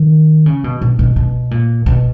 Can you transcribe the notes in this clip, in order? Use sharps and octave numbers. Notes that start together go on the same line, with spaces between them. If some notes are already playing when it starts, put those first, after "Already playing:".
Already playing: D#3
C#3
B2
B2
B2
B2
A#2
B2